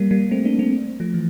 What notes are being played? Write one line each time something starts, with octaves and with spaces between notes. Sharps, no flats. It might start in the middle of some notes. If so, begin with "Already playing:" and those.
Already playing: G3 A#3
G3 A#3
A3 C4
A#3 D4
A3 C4
F3 A3
E3